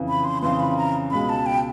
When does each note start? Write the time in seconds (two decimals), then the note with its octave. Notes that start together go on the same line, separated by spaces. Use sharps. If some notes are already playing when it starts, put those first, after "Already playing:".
Already playing: F2 C#3 E3
0.09 B5
0.25 C6
0.42 F2 C#3 E3 C6
0.60 B5
0.77 A#5
1.11 C#2 B2 G#3 B5
1.29 A5
1.46 G5